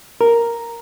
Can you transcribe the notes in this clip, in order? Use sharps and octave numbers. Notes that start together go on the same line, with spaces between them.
A#4